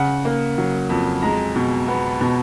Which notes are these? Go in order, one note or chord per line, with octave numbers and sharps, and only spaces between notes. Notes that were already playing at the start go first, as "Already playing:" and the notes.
Already playing: C#3 F#5
A#3
F#3
F2
G#3 A#5
B2
B3
B2